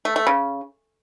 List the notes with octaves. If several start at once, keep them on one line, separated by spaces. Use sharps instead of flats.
A3
A3
C#3